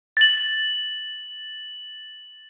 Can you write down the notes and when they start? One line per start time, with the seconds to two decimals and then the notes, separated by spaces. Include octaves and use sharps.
0.17 A6 F#7